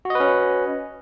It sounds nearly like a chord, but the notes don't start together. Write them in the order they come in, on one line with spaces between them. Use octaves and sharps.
F#4 D#5 B4 C#4